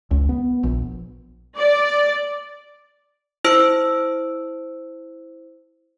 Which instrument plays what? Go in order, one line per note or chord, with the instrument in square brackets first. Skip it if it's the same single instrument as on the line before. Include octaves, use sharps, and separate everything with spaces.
[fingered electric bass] C#2
B3
A#1
[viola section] D5
[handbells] E4 C5 E6 D7